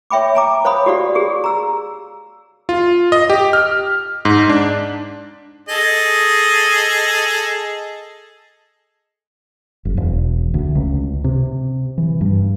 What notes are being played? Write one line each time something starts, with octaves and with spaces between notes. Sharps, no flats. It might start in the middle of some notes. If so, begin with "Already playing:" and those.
C#5 E5 G5 B5 D6
G#5 A#5 D6
C5 C#5 F5 B5 D#6
F#4 G4 D5 F5
G4 G#4
A#5 E6
F4
D#5
G4
F6
G#2
D4
G#4 A4 D#5
F#1
E1
D2
C#2
C3
E3
G2